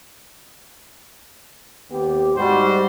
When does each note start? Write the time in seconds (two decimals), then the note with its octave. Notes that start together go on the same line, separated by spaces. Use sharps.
1.90 D#2 B3 G4
2.36 G#2 G3 D#4 F#4 C5